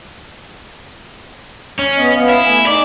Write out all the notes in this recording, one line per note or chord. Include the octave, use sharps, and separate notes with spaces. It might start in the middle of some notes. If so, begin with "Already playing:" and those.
C#4
B3 D#5
B3 F5
E4
A3 G#5
D#4 D5